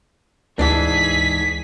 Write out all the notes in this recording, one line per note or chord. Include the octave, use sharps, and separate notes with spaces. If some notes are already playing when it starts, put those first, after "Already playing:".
D2 G#2 E3 D4 G#4 B6